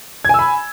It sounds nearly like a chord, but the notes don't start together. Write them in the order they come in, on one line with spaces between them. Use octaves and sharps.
G#6 G#5 E6 B5